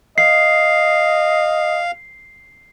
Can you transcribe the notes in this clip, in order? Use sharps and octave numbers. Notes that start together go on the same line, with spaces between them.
D#5 F5 C7